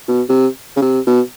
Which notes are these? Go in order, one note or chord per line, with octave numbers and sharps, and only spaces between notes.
B2
C3
C#3
C3
B2